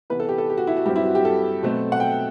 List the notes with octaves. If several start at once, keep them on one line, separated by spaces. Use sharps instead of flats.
C3 E3 B3 B4
A4
G4
A4
G4
F#4
E4
F#4
G2 F#3 C4 G4
E4
F#4
G4
A4
B2 F#3 A3 C4
F#5
G5